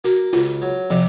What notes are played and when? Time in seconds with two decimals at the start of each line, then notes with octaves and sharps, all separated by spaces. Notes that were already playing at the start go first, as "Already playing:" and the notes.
0.04 A#3 F#4
0.33 C#2 F4
0.62 F#3
0.90 C3 F3